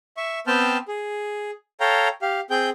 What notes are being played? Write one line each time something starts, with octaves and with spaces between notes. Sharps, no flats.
E5 C#6
B3 C4 C5 G5 A5 F6
G#4
A4 C#5 F5 G5 A#5
G4 F5
C4 G#4 G5 G6